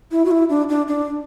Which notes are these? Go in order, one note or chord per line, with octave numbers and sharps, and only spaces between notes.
E4
F#4
E4
D4
D4
D4